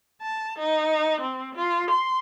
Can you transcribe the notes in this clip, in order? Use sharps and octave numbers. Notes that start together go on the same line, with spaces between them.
A5
D#4
C4
F4
C6